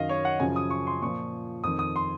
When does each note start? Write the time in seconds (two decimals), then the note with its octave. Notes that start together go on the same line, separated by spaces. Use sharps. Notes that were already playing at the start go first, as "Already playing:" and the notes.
Already playing: F#2 D#3 D#5 F5
0.09 C#5
0.25 F#5
0.39 F#2 C#3 F3 G#5
0.56 D#6
0.70 C#6
0.87 C6
1.01 A#2 F3 C#6
1.64 F2 D#3 D#6
1.79 D#6
1.96 C6